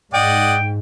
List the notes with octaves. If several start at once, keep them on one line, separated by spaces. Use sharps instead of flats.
G#2 D5 D#5 F#5 G5